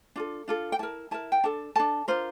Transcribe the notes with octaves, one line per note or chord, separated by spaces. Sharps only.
D4 F4 A4
D4 F4 A4
G5
E4 A#4 A5
E4 A#4 A5
G5
D4 A4 A5
D4 A4 A5
D4 F4 A#4 C5